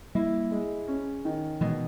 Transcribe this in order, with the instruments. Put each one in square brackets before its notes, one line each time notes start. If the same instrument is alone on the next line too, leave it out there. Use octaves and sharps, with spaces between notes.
[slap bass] G3 A#3 [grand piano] E4
[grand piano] G#3
C#4
D#3
[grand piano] B2 [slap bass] E3 G#3